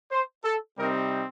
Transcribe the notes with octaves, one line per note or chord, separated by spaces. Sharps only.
C5
A4
C3 G3 C4 D#4 A#4